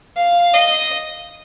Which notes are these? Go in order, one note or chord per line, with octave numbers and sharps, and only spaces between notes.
F5
D#5